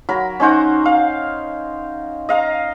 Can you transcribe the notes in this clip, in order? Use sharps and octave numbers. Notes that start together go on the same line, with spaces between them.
F#3 A#4 B5
C#4 D#4 C5 F#5
F5
D#5 F5 A#5